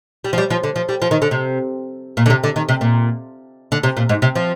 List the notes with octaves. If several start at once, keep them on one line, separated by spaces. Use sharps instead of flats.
G3
F3
G3
F3
D3
F3
G3
F3
D#3
D3
C3
A#2
D3
C3
D3
D#3
C3
A#2
D3
C3
A#2
G#2
C3
F3